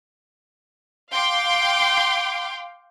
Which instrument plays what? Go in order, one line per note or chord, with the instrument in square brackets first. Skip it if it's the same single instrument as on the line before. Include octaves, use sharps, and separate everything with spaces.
[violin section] F5 G5 C6 D6